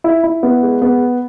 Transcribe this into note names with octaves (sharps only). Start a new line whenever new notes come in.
E4
E4
B3
G#3
B3